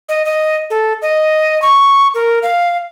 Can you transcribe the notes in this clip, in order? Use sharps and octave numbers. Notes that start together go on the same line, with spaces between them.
D#5
D#5
A4
D#5
C#6
A#4
F5